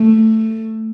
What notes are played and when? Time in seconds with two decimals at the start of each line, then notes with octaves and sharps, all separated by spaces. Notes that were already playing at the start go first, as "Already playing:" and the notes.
Already playing: A3